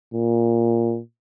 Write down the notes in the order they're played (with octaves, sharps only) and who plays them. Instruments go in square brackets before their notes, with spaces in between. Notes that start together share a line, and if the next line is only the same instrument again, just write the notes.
[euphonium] A#2